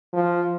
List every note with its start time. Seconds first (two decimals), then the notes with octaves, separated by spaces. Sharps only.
0.14 F3